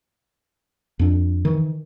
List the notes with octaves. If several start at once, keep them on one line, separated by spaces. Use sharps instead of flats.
F2 D4
D#3 E3